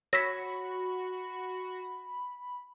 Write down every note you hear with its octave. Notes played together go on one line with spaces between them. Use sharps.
F#4 C#5 B5 E6 A#6 B6